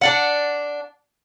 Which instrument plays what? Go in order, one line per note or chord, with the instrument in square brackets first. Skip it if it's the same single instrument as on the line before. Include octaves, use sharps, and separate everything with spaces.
[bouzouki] D4 D5 F#5